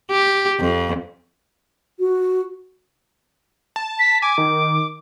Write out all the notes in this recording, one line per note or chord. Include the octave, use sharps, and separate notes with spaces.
G4
F2
F#4
A5
B6
G#5 D6
D#3